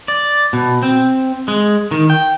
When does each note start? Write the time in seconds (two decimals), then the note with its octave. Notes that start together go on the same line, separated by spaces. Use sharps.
0.08 D5
0.53 B2
0.83 C4
1.48 G#3
1.91 D#3
2.10 G5